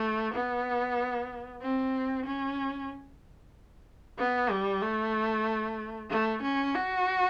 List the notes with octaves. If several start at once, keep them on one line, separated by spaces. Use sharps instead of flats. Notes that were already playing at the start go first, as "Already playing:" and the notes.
Already playing: A3
B3
C4
C#4
B3
G3
A3
A3
C#4
F#4